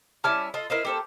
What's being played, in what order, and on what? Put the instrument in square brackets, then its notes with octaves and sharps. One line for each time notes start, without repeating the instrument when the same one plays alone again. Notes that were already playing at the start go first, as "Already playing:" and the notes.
[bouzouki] G3 C#4 E4 [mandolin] A5 D6 F6
[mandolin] F4 A4 [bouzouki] D#5
[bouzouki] E4 C5 D#5 [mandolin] A#4 F5
[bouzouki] A#3 A4 C5 [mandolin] G4